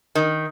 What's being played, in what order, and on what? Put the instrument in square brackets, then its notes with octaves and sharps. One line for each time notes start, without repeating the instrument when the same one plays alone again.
[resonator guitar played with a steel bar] D#3